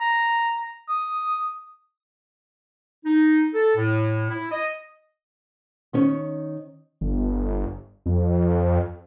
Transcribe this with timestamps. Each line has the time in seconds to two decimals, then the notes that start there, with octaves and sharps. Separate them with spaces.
0.01 A#5
0.89 D#6
3.05 D#4
3.54 A4
3.76 A2
4.29 E4
4.51 D#5
5.93 D#3 C#4 C#5
7.01 G1
8.06 F2